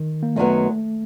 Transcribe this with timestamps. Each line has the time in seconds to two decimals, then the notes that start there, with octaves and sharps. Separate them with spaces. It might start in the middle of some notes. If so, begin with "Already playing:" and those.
Already playing: D#3
0.23 A#3
0.36 F#2 D#3 F#3 A3 B3